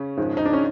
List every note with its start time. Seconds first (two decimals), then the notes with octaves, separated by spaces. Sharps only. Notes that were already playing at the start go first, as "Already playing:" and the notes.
Already playing: C#3 C#4
0.17 G#1 G#2 F3 G#3
0.37 D#4
0.45 D4
0.53 C#4